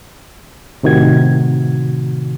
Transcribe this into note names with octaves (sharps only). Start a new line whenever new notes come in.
A2 C3 D#3 F#4 G#6